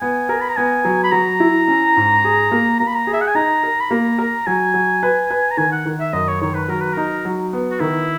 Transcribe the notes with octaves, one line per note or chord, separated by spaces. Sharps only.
B3 G#5
A#4
B5
A#5
B3 G#5
F#3
B5
F#3 A#5
E4
C#4
G#2
G#4
A#3
A#3 A#5
B5
A#5
G#4
E5
F#5
G#5
D#4 A#5
A#4
B5
A#3 A#5
A#4
F#3 G#5
F#3
B4
B4
A#5
D#3 G#5
F#5
D#3
E5
F#2 D#5
C#5
D#3 C#5
B4
F#3 A#4
B4
D#4 A#4
F#3
B3
F#4
D#3 E4